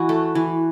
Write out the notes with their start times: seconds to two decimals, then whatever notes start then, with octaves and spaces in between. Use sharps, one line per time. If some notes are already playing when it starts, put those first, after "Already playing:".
Already playing: E3 E4 F#4
0.09 A3
0.35 E3